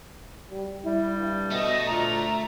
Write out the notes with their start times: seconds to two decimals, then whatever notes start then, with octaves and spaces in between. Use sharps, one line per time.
0.50 G3
0.85 G3 E4
1.18 G2
1.51 B2 A3 D#5
1.87 D2 A#2 A#5